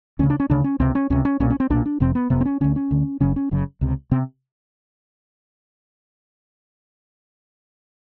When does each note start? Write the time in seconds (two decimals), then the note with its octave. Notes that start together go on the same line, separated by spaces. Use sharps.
0.19 D2 C#3 C#4
0.30 D4
0.40 C#4
0.50 D2 C#3 D4
0.64 C#4
0.80 C#2 C3 C4
0.95 C#4
1.10 C#2 C3 C#4
1.25 C#4
1.40 B1 A#2 C#4
1.50 C#4
1.60 C4
1.70 B1 A#2 D4
1.86 D4
2.00 F1 F2 C3 C4
2.15 B3
2.30 F1 F2 C3 B3
2.41 C4
2.45 C#4
2.61 D2 D3 C#4
2.76 C#4
2.91 D2 D3
3.20 F#1 F#2 C#3 C#4
3.36 C#4
3.51 F#1 F#2 C#3
3.81 C#2 C3
4.11 C3 C4